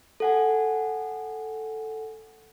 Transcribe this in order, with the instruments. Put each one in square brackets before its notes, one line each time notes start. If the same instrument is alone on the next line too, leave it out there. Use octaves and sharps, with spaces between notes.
[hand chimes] A4 F#5 G#5